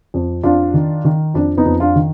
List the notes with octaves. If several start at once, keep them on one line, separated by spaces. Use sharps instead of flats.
F2
F2 D4 F4
D#3
D#3
F2 D4
B3 D#4
F2
D4 F4
D#3